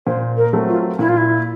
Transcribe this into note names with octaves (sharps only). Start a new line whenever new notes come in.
A#2 C5
A#4
F#3 A3 C4
F4
A#2 E4
F4
E4